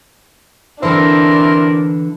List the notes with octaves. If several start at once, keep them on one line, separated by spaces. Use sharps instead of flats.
D3 E3 C4 D4 E4 A#4